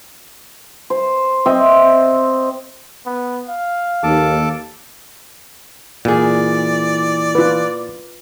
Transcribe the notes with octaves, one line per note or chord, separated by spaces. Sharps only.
C5
C4 D#5 E5 G5
B3
F5
D#2 A4 A5 D6
A#2 E3 G#4 D5
F4 B4